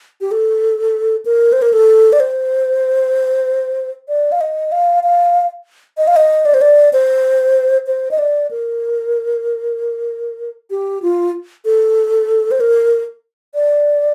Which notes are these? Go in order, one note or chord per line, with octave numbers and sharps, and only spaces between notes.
G4
A4
A#4
C5
A#4
A4
D5
C5
D5
F5
D#5
F5
F5
D#5
F5
D#5
D5
C5
D5
C5
C5
D#5
D5
A#4
G4
F4
A4
C5
A#4
D5